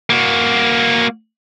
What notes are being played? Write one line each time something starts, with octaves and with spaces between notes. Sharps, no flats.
A#3 F#4